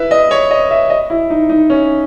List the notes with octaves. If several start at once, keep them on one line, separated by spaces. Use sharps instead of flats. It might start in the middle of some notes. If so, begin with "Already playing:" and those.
Already playing: E4 B4 E5
D#5
C#5
D#5
E5
D#5
E4
D#4
D#4
C#4